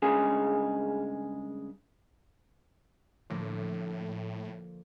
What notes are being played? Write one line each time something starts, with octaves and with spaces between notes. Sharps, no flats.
G2 C#3 G#3 G#4
A2 D3 F3 A#3